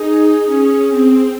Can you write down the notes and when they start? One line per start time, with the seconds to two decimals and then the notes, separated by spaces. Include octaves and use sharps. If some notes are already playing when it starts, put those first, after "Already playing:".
Already playing: D#4 G#4
0.45 C#4
0.89 C4